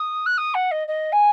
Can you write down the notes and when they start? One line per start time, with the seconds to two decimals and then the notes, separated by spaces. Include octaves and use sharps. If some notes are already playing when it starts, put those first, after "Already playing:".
Already playing: D#6
0.26 F#6
0.38 D#6
0.55 F#5
0.71 D#5
0.88 D#5
1.12 G#5